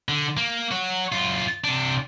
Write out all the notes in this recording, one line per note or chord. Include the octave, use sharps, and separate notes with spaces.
D3
A#3
C#5 F#5
F#2 F4
C3 D4